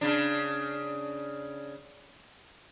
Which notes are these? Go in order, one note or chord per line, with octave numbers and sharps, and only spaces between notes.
C#3 D4